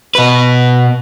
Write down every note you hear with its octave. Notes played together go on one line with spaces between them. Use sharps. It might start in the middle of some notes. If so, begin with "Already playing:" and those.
B2 B4